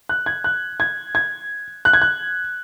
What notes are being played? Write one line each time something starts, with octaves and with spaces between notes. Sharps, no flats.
F#6
G#6
F#6
G#6
G#6
F#6
G#6
F#6